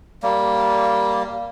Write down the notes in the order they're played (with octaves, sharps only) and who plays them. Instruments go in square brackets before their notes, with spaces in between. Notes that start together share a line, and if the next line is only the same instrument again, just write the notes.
[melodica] G3 A#3